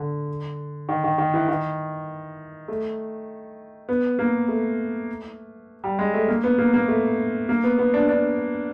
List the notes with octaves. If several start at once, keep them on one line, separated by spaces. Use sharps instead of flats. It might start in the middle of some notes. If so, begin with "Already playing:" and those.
Already playing: D3
D#3
D#3
D#3
E3
D#3
A3
B3
A#3
A3
G3
G#3
A3
A#3
B3
A#3
A#3
A3
A#3
B3
B3
D4
D4